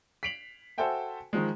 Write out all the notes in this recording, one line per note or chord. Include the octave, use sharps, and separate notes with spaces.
B6 C7 D7 F7 F#7
F#4 A4 C5 E5 G5 G#5
D#3 F3 G#3